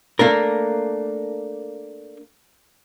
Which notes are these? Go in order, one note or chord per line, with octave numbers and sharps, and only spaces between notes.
A3 A#3 D4 A#4